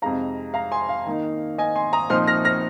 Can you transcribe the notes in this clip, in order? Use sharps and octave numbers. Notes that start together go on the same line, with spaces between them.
F2 C3 G#3 D#4 F5 A#5
F5 A#5
G#5 C6
F5
D#3 A#3 D#4
D#5 G#5
G#5 C6
A#5 D#6
A#2 F3 C4 D#4 C6 F6
F6 A#6
F6 A#6